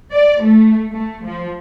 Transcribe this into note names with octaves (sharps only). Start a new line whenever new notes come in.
D5
A3
A3
F3